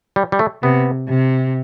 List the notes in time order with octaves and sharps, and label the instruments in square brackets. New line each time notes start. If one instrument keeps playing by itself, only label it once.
[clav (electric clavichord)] G3
G3
A3
[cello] C3 [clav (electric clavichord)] B3
[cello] C3